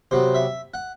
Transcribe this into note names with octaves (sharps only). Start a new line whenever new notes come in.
C3 F#3 B3 C5
E5
F#5